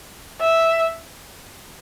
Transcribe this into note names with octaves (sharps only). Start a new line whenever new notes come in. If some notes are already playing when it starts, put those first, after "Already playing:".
E5